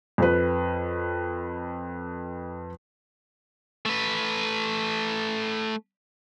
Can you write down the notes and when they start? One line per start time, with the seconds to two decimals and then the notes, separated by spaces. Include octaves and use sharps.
0.18 F2 B4
3.86 A3 B4